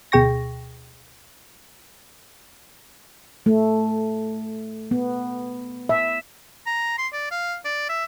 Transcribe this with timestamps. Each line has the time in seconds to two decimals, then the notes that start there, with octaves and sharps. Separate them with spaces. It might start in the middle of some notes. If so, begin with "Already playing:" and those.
0.12 D2 B2 G#4 G5 C#6 A#6
3.46 A3
4.91 B3
5.89 E5
6.66 A#5
6.98 C6
7.13 D5
7.31 F5
7.65 D5
7.89 E5